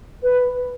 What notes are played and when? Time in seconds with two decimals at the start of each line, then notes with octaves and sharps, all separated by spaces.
0.23 B4